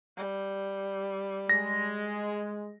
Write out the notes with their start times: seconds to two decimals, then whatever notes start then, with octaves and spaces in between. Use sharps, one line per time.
0.17 G3
1.49 G#3 A#6